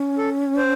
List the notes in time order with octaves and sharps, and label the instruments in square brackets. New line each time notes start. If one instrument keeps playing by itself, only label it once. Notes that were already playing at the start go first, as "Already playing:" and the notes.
Already playing: [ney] C#4
[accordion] A4
C5